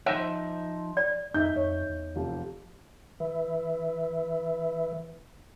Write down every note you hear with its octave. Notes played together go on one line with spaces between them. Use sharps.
F3 D#4 C5 E5
D5
F2 D#4 E5 G6
F2 C#5
E2
F1 F3
E3 B4 E5